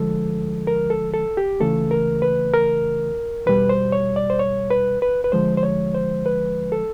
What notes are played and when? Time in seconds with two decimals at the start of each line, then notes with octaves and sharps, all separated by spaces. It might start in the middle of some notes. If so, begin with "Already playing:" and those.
Already playing: D2 D3 F3 G#3 A4
0.67 A#4
0.90 A4
1.14 A4
1.37 G4
1.60 C#2 C#3 E3 A3 A4
1.91 A#4
2.22 B4
2.53 A#4
3.46 E2 B2 G3 B4
3.69 C5
3.92 C#5
4.16 D5
4.30 C5
4.39 C#5
4.70 B4
5.02 B4
5.24 B4
5.32 D2 D3 F3 G#3 C5
5.57 C5
5.63 C#5
5.95 C5
6.26 B4
6.72 A4